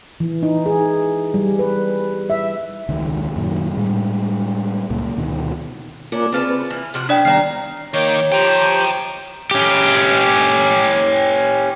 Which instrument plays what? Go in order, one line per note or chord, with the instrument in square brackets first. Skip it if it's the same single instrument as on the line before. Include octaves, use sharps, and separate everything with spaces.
[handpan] E3
D#4
G#4
G3
B4
E5
[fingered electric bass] E1 C#2 D#3
F#2 A#2 D#3
A2 G3 G#3
C#2 A#2
D2 B2 D#3
[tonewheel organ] A#3 F4 A#4 [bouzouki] C#4 D4
[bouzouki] C#3 F4 A5 [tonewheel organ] C4 B4
[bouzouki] E3 [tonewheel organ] F6
[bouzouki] C3 F3 F#4
[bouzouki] F#3 B3 [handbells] D4 D5 G5
[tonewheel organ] D#3 G3 B3 [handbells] D5 C7 [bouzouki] F5 A5 A#5
[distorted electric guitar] D#3 [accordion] A#3 G5 D6 [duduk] C#5
[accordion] F3 G4 C5 [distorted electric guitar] G5 A#5
[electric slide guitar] C#4 G4